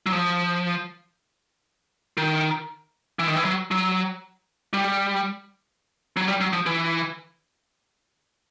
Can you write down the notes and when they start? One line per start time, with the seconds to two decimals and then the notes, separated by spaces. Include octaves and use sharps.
0.06 F#3
0.12 F3
2.17 D#3
3.19 E3
3.28 D#3
3.36 E3
3.45 F#3
3.71 F#3
4.73 G3
6.17 F#3
6.28 G3
6.40 F#3
6.53 F3
6.66 E3